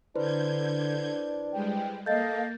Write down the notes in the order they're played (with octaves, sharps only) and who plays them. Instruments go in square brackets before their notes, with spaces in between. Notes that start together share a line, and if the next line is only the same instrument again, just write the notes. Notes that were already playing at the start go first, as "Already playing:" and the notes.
[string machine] D3 G6 G#6 [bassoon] D4 [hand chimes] E4 B4 C5
[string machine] G3 G#3 [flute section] G5
[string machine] A#3 [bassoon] A4 [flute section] D#5 F5 [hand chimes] G6 A6